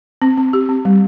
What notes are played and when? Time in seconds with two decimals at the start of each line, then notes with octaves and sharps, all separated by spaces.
0.22 C4
0.38 C4
0.53 G4
0.69 C4
0.85 G3